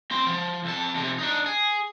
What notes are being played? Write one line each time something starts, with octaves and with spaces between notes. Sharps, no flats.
C4 C6
F3
F2 A5
F2 C3
D4 D#4
G#4